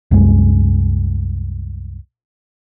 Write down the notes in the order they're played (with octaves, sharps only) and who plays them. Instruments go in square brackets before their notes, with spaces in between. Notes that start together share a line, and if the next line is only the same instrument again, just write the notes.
[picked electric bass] C2 F#2 G#3